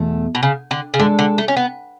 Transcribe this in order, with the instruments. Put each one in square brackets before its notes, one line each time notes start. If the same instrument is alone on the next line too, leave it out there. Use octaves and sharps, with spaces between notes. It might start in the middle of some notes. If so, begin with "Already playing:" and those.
Already playing: [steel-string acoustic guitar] E2 B2 A3
[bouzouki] B2
C#3
D3
C#3
[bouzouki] D3 [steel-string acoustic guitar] G#3 D4 A4 D5
[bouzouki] D3
A3
C#4
B3